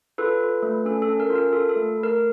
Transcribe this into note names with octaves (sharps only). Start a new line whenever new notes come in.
F4 A4 B4
F4
A3
C#4 A4
A4
C#4
A#4
F4
A#4
F4 A4
A4
A3
A3
A#4